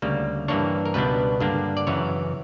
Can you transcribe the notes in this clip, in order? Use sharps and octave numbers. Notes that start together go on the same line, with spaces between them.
D2 C#3 G3 A#3
G2 E3 A#3 D4 C#5
A#4
C#2 B2 G3 B3 D4 B4
G2 D3 A#3 D4
D5
F#2 C#3 E3 C#5